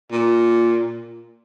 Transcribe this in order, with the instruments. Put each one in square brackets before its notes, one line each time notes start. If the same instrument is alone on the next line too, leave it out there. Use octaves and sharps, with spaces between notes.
[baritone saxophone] A#2